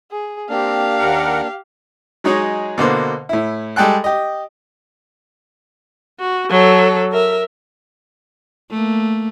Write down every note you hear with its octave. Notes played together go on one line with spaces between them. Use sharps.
G#4
A#3 C4 D4 G4 F5
D#2 A#4 F#5
F#3 G#3 D#4 G#4 C#5
B2 D3 A#3 C5
A2 E4
G3 G#3 A4 G5 F#6
G4 D#5
F#4
F#3 A4
A#4 E5
A3 A#3